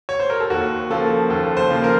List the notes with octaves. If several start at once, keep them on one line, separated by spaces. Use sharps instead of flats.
C#5
C5
A#4
A4
D#2 F#4
C#3 F3 A#3 A4
D#2 A4
C5
C#3 F3 A#3
A#4